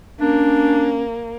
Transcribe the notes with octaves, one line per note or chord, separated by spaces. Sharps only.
A#3 C#4 D4